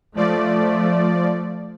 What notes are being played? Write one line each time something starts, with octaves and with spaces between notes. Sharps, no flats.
F3 A3 D5